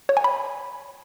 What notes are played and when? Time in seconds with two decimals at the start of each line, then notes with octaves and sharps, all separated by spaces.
0.09 C#5
0.17 G#5
0.24 B5